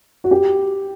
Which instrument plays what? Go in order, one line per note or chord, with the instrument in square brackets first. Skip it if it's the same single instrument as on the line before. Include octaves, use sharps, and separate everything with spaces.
[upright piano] F#4
G4